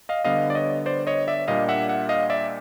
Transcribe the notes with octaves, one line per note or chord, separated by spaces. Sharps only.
D#5 F5
D3 G3 B3 D#5 F5
D5
C#5 D#5
C5 D5
C#5 D#5
D5 E5
A#2 G3 A#3 D4 D#5 F5
E5 F#5
E5 F#5
D#5 F5
D5 E5